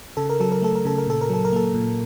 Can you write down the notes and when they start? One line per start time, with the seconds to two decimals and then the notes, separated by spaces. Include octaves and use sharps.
0.17 C#3 A4
0.29 A#4
0.40 F#3 A4
0.52 A#4
0.62 A3 A4
0.75 A#4
0.85 C#3 A4
0.98 A#4
1.07 A#2 A4
1.21 A#4
1.29 F#3 A4
1.45 A#4
1.52 A#3 A4
1.74 A#2